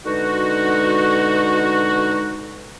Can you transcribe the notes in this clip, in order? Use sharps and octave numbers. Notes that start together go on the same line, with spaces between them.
B2 D3 G#3 D#4 F#4